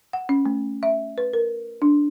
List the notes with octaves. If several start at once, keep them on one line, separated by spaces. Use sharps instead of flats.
F#5
C#4
A3
E5
B4
A#4
D4